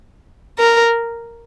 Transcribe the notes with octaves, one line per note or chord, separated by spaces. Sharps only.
A#4